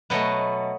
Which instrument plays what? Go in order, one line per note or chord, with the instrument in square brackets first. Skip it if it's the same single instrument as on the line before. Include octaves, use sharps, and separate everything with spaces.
[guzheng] B2 F#3 A3 B4 D#5